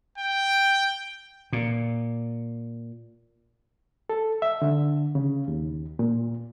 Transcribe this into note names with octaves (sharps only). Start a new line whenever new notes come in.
G5
A#2
A4
E5
D3
C#3
D#2
A#2